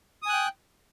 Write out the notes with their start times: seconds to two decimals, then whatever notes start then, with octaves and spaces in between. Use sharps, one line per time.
0.23 D#6
0.26 G#5
0.29 F#6
0.33 G5